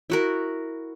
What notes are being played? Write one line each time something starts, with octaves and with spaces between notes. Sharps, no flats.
E4 F#4 A#4